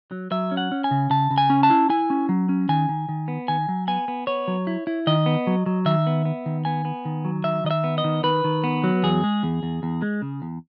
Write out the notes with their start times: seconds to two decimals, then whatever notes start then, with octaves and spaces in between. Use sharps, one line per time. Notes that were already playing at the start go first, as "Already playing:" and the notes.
0.11 F#3
0.31 F#3 E5
0.51 C#4
0.57 F#5
0.72 C#4
0.84 G#5
0.91 C#3
1.10 C#3 A5
1.31 C#3
1.38 G#5
1.50 C#4
1.63 A5
1.70 E4
1.90 E4 G#5
2.10 C#4
2.29 F#3
2.49 C#4
2.69 D#3 G#5
2.89 D#3
3.09 D#3
3.28 B3
3.48 D#3 G#5
3.69 F#3
3.88 B3 G#5
4.08 B3
4.27 B3 C#5
4.48 F#3
4.67 E4
4.87 E4
5.07 D#3 D#5
5.26 B3
5.47 F#3
5.66 F#3
5.85 D#3 E5
6.07 B3
6.25 B3
6.46 D#3
6.65 B3 G#5
6.85 B3
7.05 D#3
7.25 F#3
7.44 D#3 E5
7.64 D#3 D#5
7.71 E5
7.84 B3
7.98 D#5
8.04 D#3
8.23 D#3 B4
8.44 D#3
8.64 B3
8.84 F#3
9.03 E2 G#4
9.24 G#3
9.43 E2
9.63 E2
9.83 E2
10.02 G#3
10.22 C#3
10.42 E2